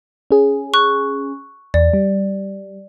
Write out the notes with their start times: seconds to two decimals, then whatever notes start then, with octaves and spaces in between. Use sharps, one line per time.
0.31 C#4 G#4
0.74 C#6 F#6
1.74 E2 D5
1.93 G3